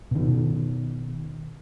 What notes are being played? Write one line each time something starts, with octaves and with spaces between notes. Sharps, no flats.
B2 D#3